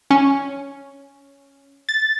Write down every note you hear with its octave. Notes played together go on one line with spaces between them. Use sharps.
C#4
A6